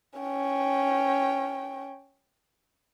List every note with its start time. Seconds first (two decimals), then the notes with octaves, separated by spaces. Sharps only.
0.19 C#4 G5